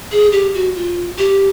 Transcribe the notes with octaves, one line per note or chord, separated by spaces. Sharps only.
G#4
G4
F#4
F4
G4